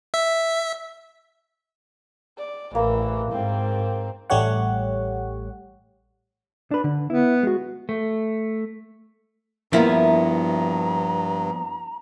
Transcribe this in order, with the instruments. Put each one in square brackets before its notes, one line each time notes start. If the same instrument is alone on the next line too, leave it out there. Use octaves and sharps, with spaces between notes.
[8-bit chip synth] E5
[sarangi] D5
[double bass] A1 [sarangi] E3 [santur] A#3
[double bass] G#2 [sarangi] C4
[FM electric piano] A1 G3 A3 G4 C#5 F#5
[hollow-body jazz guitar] D4 B4
D3
[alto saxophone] B3 [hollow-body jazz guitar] E4
[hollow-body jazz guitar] G#3 F#4
[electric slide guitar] A3
[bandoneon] G2 [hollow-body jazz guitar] F3 A#3 B3 [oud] E4 [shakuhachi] A#5